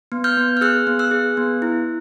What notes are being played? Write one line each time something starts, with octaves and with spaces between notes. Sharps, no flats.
B3
F6 G6
B3
F6
G#4 E6 F#6
B3
E6 F#6
G#4
B3
E4